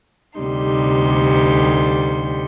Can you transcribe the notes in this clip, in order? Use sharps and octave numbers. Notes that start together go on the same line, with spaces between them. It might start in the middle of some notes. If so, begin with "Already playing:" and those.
D2 C3 G3 D#4 C6